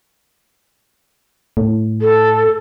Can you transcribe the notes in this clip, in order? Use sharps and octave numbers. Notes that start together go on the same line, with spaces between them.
A2
A4